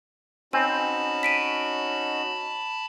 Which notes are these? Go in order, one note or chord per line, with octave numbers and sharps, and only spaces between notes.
C4 C#4 D#4 F#4 G#5 A5 B5
B6 D7 D#7